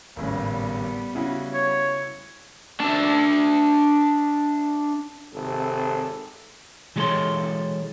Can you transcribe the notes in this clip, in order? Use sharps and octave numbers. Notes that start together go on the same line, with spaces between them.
G#1 A2 C#3 G3 B3
C#3 E4 F#4
C#5
D4 E5
G#1 C3 A4
E3 G3 G#3 A4 C#5 C6